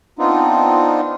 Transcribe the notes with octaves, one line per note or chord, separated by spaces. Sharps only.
B3 C4 D4 D#4 F4